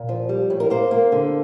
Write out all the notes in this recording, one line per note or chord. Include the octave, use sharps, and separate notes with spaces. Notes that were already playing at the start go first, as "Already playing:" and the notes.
Already playing: A#2
F3
G3
A2
A#4
A#3 C5
A#3
D3